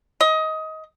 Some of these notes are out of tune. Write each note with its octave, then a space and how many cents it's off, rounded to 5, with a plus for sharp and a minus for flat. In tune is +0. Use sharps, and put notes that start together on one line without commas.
D#5 +20